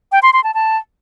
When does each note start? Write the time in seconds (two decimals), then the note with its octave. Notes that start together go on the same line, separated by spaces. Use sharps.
0.12 G5
0.23 C6
0.33 C6
0.44 A5
0.54 A5